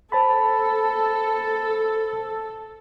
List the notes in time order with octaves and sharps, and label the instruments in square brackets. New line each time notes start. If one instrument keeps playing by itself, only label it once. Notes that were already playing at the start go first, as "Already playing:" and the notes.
[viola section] A4 [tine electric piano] C5 A5 B5